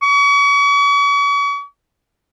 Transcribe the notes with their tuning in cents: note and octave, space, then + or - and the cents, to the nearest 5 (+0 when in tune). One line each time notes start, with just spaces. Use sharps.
C#6 +40